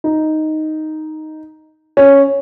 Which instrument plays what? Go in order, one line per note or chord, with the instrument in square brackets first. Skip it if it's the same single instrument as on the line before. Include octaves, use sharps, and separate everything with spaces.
[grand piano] D#4
C#4